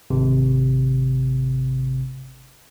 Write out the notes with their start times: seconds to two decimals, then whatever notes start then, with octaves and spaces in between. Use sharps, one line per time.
0.10 G#1 C3